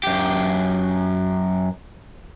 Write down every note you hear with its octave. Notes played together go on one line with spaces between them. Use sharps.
F#2 G4